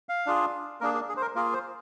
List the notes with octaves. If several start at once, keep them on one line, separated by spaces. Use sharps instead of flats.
F5
D4 F4 G#4
A#3 D4 G#4 A#4
G#4
G#4
C5
A#4
A#3 F4 G#4 A#4
C5